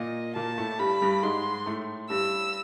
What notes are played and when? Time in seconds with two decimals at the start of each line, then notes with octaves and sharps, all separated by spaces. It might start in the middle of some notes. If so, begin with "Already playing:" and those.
Already playing: A#2 A#3 D#5
0.36 A#2 A#3 A5
0.58 A2 A3
0.79 G2 G3 B5
1.01 G2 G3
1.23 G#2 G#3 C6
1.66 A2 A3
2.10 G2 G3 E6